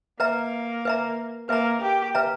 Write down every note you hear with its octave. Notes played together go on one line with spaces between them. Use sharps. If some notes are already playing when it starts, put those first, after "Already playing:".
A#3 B4 E5 A#5
B4 E5 A#5
A#3 B4 E5 A#5
G4
B4 E5 A#5